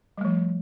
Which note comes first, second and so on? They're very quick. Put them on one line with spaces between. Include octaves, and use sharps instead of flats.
G3 A3 F3